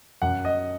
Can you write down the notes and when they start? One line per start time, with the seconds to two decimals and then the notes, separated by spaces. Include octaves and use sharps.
0.22 F#2 F#5
0.45 D#5